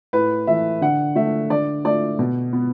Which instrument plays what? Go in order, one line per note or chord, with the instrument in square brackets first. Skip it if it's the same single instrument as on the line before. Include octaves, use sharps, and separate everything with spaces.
[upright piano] A2 B4
E3 A3 E5
D3 F#5
A3 E5
D3 D5
A3 D5
B2
B3